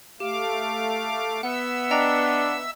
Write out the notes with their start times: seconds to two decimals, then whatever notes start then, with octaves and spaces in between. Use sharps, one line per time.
0.20 A3 G4 F5 D6
1.43 B3 E5 F#5 E6
1.91 D4 D#5 G5 A#5